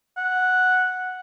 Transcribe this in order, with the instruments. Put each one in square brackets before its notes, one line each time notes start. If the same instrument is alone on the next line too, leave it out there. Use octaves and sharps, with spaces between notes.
[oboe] F#5